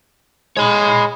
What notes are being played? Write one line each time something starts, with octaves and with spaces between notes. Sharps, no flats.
G#3 C#5 B5